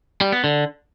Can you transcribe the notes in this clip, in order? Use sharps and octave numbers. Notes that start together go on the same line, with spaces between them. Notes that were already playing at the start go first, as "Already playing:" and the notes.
G3
B3
D3